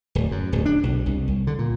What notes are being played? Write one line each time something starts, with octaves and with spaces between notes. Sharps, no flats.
D1
F#2
D1
D4
B1
C2
C2
D3
A#2